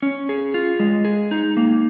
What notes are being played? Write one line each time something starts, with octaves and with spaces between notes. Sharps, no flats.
C#4
G#4
F4
G#3
G#4
D#4
A#3